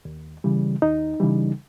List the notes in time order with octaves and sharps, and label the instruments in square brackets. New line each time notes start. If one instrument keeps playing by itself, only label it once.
[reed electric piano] D#2
C#3 E3 G3
D#2 D#4
C#3 E3 G3